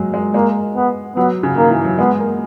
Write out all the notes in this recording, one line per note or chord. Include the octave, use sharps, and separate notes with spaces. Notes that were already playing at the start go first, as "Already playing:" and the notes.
Already playing: F#3 G#3 A#3
G#3
G#3 A#3
B3
F#3 B3
C#3
D#3 A#3
E3
F#3
G#3 B3
A#3